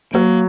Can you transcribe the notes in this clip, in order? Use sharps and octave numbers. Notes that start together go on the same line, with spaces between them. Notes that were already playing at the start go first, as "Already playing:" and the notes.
F#3 A#3